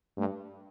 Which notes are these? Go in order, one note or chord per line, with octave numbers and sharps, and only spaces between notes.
G2 A3